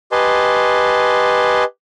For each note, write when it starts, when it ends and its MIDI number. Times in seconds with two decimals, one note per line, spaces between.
0.12 1.64 67
0.12 1.64 71
0.12 1.64 75
0.12 1.64 80
0.12 1.64 81
0.12 1.64 84